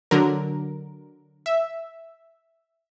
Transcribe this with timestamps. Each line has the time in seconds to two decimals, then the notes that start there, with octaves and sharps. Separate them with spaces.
0.11 D3 F#3 A#4
1.46 E5